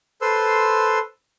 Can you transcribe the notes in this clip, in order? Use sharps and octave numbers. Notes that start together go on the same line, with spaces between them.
A4 B4 C5 C6 E6